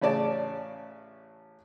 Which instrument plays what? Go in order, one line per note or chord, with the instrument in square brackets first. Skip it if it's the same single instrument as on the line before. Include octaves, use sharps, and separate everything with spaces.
[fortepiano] A1 C#3 C#4 D5 A5